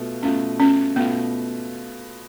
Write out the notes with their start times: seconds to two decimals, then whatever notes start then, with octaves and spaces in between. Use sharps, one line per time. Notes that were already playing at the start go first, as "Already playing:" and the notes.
Already playing: B2 A3 F4
0.23 B2 A3 C#4 F4
0.60 C#4
0.96 B2 A3 B3 F4